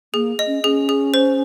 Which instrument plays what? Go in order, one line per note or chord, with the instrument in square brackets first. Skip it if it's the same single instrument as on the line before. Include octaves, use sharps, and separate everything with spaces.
[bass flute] A#3 [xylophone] G#4
[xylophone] D#5
[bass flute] C#4
[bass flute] C#4 [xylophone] G#4
[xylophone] G#4
C5